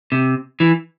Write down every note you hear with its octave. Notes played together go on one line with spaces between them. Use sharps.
C3
E3